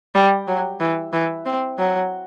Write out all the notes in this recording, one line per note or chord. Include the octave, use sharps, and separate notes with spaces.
G3
F#3
E3
E3
C4
F#3